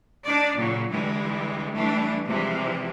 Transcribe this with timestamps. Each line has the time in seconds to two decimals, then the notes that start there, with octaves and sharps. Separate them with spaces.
0.25 D4 D#4 D5
0.56 A#2 C#3 F#3
0.91 D3 E3 G3 G#3
1.74 E3 G3 A3 D4
2.26 C3 E3 F3 G3 G#3